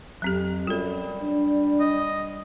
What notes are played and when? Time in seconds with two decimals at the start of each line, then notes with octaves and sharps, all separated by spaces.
0.22 F2 F#3 C4 G4
0.67 F#2 G3 F4 A4
1.22 D4
1.80 D#5